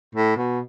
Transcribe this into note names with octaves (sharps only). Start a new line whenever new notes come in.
A2
B2